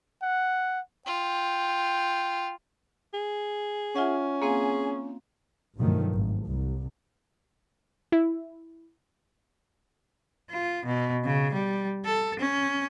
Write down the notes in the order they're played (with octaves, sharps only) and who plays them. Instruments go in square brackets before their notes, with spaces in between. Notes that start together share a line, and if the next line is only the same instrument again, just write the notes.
[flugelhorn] F#5
[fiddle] F4 [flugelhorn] G5
[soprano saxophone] G#4
[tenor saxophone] C#4 [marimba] F4 E5 F#5
[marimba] A#3 C4 F5 [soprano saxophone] G#4
[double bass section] G2 B2 D#3 F3 F#3 A3
G#1
C2
[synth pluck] E4
[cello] F4
B2
C#3
G3
A4
C#4